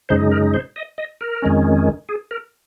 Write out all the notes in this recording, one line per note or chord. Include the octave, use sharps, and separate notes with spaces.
F#2 C#3 G#3 D#4 C5
A#4
C5
D#5
D#5
A#4
F2 D#3 G#3 C#4
G#4
A#4